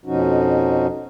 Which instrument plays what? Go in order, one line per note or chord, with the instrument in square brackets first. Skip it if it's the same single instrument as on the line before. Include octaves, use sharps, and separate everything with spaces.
[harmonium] F2 B2 F3 C#4 D#4 F#4